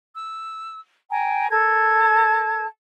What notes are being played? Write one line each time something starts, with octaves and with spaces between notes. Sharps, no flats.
E6
G5 G#5 A#5
A4 A#4 A5 G#6